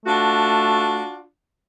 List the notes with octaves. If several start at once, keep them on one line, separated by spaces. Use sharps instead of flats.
A3 D4 F4 F#4